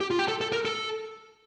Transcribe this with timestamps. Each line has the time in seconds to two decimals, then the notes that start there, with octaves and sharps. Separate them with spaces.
0.01 G4
0.11 F4
0.19 G4
0.28 A4
0.41 A4
0.52 A#4
0.65 A4